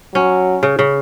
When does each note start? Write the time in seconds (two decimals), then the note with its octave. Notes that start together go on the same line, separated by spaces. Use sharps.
0.14 F#3 C#4
0.63 C#3
0.79 C#3